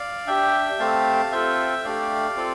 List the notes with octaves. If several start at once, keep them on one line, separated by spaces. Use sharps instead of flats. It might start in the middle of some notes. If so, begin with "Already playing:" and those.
Already playing: D5 F5
D4 G4 E5 G5
A3 C4 G4 F5 A5
C4 F4 A4 E5 G5
A3 D4 G4 D5 F5
C4 F4 A4